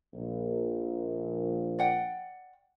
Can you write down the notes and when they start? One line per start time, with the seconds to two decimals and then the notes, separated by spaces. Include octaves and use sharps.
0.14 A#1
1.79 D5 F#5 G5